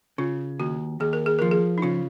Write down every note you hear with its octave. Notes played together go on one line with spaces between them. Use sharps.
C#3 F4
D#2 F#4
D#2 G#4
A#4
G#4
F3 A#4
G#4
D#4
C#3 F4